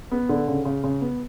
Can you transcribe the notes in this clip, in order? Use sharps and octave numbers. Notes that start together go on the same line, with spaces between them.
B3
D3
C#3
C#3
C#3
B3